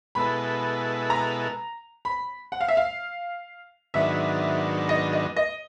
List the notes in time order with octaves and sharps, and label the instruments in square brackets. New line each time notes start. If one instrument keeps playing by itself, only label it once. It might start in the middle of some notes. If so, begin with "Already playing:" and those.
[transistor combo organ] B2 G#3 B3 E4 A4 [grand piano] B5
[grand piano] A#5
B5
F#5
F5
E5
F5
[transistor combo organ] G#2 D#3 F#3 B3 D4 [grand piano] E5
[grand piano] D#5
D#5
D#5